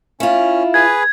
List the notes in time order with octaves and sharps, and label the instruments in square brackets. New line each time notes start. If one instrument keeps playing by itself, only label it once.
[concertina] C#4 [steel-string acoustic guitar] E4 F4
[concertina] G#4 B4 [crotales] G#6